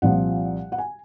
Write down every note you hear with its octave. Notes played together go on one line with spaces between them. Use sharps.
C2 A#2 F3 F#5
F#5
G#5